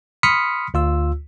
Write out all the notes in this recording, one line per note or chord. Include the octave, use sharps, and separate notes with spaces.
B5 C6 D#6 F6 B6 C#7
D2 F4 E6